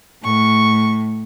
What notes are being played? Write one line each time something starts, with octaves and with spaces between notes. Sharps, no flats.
A2 C#6